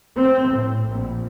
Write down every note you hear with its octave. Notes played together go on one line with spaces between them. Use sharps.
C4
A2
A#1